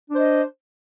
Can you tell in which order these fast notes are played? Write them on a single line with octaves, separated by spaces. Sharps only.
D4 C5 D#5